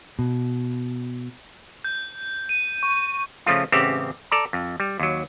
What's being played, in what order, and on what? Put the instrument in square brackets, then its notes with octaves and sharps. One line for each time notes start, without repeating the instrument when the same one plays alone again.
[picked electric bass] B2
[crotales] G6
D#7
C#6
[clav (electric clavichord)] C#3 F3 A3 F4
A1 C#3 C4 G4 E5 F#5
A4 D5 A#5
F2
G3
D#2 F#3